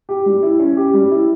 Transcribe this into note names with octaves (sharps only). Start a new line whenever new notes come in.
G4
G3
E4
C#4
G4
G3
E4